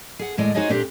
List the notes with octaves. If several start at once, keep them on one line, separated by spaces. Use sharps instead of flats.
G#4 F#5
D#2 A2 G#3 D5 D#5
D#4 F#4 G#4 C5 C#5 D#5
A#2 A3 C4 D4 G4